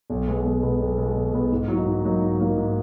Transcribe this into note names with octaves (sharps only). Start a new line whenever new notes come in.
B1
B2 G#3 B3
B1
B2 G#3 B3
B1
B2 G#3 B3
B1
B2 G#3 B3
G#2
F#3 A#3 D#4 F#4
G#2
F#3 A#3 D#4 F#4
G#2
F#3 A#3 D#4 F#4
G#2